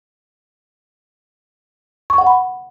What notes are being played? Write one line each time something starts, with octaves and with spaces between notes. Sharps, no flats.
C#6
F#5
B5